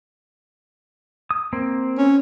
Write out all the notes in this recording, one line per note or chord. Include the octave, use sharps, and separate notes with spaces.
D#6
A#3 C4
C#4